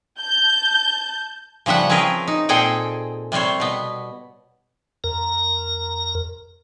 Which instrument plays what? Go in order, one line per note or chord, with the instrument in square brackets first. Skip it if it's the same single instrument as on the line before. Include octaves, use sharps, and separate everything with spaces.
[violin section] A5 G6
[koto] C#3 F3 G3 E5 F#5
C4 C#4 G#4 A#4 B4
D#4
A#2 C4 G#4 A4 F#5 G5
C3 G3 C4 C5 C#5
B2 B3
[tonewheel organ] F2 A#4 A#5